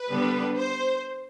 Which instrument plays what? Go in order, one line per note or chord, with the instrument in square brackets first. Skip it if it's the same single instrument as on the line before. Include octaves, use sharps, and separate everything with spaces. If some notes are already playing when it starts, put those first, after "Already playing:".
Already playing: [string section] B4
D3 G3 B3 D4
C5